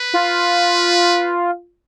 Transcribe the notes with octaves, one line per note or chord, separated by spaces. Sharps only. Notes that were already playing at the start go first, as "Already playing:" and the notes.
Already playing: B4
F4